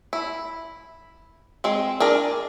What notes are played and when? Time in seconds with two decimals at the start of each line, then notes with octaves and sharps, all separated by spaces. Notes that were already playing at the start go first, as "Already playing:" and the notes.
0.13 E4
1.64 G#3 C4
2.00 D4 G#4 A#4